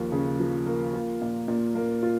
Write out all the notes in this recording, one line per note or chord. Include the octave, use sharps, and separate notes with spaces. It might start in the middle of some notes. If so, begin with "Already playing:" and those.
Already playing: D#2 F3 A#3
C#3
F3
A#3
F4
A#2
A#2
A#3
F4